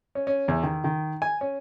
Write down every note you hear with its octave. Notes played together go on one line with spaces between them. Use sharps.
C#4
C#4
E2
D#3
D#3
G#5
C#4